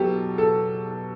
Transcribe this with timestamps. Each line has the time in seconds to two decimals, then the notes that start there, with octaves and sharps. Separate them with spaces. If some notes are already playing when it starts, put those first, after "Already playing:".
Already playing: B2 F#3 G4 A4
0.38 A4